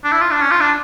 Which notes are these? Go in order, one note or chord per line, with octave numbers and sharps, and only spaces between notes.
D4
E4
F4
D4
C#4
F4
D4